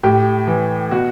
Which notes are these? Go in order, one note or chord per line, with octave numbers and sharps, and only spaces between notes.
A2 G4
E3
B2 F#4